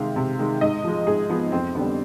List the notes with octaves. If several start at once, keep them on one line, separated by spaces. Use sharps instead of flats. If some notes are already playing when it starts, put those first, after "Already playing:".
Already playing: C3 D#3 G#3 F5
C3
D#3 G#3
G#2 D#5
F3 G#3
G#2 G#4
F3 G#3 B3
F2 C4
D3 G3 B3